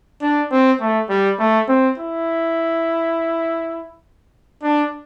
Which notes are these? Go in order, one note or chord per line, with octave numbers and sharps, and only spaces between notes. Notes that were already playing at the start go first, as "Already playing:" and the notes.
D4
C4
A3
G3
A3
C4
E4
D4